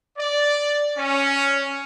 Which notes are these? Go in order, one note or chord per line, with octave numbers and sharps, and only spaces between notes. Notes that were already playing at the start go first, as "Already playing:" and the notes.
D5
C#4